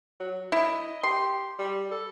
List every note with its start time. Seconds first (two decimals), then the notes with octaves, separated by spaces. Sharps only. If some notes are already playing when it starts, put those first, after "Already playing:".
0.20 F#3
0.52 E4 D#5
1.03 G4 C6
1.59 G3
1.91 A4